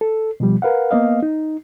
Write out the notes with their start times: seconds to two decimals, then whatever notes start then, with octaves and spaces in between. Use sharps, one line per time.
0.01 A4
0.40 B2 F3 G3
0.62 A#4 B4 F5 F#5
0.91 A#3 B3 D#5 F5
1.23 D#4